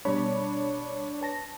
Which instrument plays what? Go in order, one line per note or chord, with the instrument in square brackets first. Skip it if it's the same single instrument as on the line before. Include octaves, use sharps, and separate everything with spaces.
[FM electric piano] B2 G3 B5 [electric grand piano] D4 C#5
[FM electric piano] B4 A5 A#6